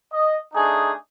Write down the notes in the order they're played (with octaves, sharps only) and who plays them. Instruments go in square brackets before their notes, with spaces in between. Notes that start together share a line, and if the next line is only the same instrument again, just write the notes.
[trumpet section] D#5
A3 D4 D#4 G#4